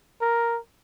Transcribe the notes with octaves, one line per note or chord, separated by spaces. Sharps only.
A#4